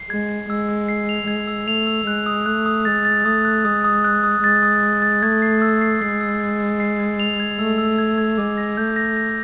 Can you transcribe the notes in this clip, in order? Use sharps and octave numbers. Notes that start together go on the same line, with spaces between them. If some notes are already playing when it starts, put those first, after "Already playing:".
Already playing: C7
G#3 G#6
G#6
G#3 E6
E6
C7
F7
G#3 G#6
E6
A3 F7
E6
G#3 F#6
D#6
A3 F#6
D#6
G#3 A6
A6
A3 D#6
F#6
G#3 D#6
D#6
F#6
D#6
G#3 A6
D#6
A6
A6
A3 G#6
C7
E6
C7
G#3 C7
E6
G#6
E6
C7
G#6
F7
G#6
A3 E6
E6
G#6
G#6
G#3 D6
A#6
A3 G6
A#6
A#6